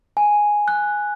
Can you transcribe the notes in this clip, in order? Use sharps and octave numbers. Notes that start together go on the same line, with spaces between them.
G#5
F#6